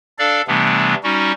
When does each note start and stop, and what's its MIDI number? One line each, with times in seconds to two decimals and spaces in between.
0.19 0.42 62
0.19 0.42 69
0.19 0.42 74
0.19 0.42 77
0.48 0.95 48
0.48 0.95 52
0.48 0.95 55
0.48 0.95 57
0.48 0.95 59
0.48 0.95 62
1.03 1.32 55
1.03 1.32 61
1.03 1.32 63
1.03 1.32 66